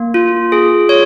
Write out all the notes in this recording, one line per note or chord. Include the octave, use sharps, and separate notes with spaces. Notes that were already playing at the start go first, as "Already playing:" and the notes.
Already playing: A#3
F4
G#4
C#5